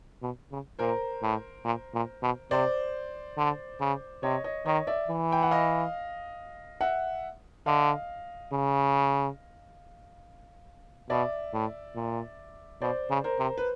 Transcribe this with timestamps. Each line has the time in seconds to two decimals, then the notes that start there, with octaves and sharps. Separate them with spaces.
0.22 B2
0.51 C#3
0.79 A#2 A#4 C5
1.22 A2
1.65 A#2
1.94 A#2
2.22 B2
2.51 C3 C5 D5
3.37 D3
3.80 C#3
4.23 C3 C#5 D#5
4.44 C#5 D#5
4.65 D#3 C#5 D#5
4.87 D5 E5
5.09 E3
5.32 G5
5.43 F#5
5.51 D#5 F5
6.81 E5 F#5
7.66 D3 D#5 F5
8.52 C#3
11.10 B2 D5 E5
11.53 A2
11.95 A#2
12.81 B2 C5 D5
13.10 C#3
13.24 A#4 C5
13.39 C3
13.58 B4